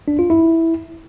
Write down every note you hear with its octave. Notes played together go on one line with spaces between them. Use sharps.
D4
F4
E4